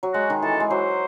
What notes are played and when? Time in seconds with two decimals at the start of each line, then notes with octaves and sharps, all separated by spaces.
0.03 F#3
0.13 G#3 F#4
0.30 D#3
0.42 E3 A4
0.60 G#3
0.70 F#3 C5